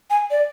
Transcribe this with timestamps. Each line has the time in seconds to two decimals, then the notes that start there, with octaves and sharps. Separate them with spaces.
0.10 G#5
0.31 D5